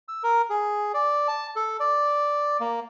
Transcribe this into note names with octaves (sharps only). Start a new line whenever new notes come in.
E6
A#4
G#4
D5
A5
A4
D5
A#3